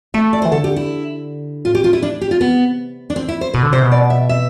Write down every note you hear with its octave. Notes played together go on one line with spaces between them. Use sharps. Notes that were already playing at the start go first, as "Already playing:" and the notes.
A3 E5
D5
C5
E3
D3 A4
G4
E4
A2 F4
G4
F4
E4
D4
G4
F4
C3 B3
D4
B2 C4
E4
C5
B2 B4
D3
C3 C5
B2
D5
E5
E5